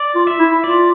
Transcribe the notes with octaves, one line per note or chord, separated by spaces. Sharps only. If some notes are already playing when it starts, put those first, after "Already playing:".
Already playing: D5
F4
E5
E4
F4 D5